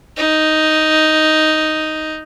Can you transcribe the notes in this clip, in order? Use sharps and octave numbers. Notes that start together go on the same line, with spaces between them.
D#4